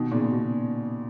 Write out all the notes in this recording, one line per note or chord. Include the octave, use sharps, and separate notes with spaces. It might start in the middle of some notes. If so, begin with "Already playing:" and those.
Already playing: B2 D#3
A#2 C#3
B2